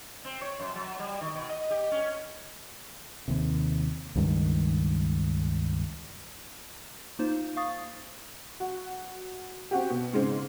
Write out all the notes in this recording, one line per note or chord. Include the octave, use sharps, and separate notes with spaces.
C4
C#5
F#2
F#3
G3
D#3
B2
D#5
G4
C#4
D#2 C3
C#2 G2 D#3 G#3
A#3 D#4 F4 C5
F5 C#6 D#6 A6
F#4
C4 F#4 G4
B2
G#2 C#3 G#3 C4